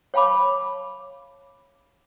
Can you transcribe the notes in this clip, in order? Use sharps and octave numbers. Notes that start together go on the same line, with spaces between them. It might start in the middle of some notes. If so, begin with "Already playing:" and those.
C#5 F5 A5 B5 D6